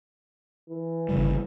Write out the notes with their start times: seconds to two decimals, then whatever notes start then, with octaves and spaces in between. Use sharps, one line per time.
0.70 E3
1.09 G1 C#3 G3